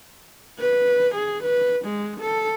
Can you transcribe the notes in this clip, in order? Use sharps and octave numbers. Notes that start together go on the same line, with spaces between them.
B4
G#4
B4
G#3
A4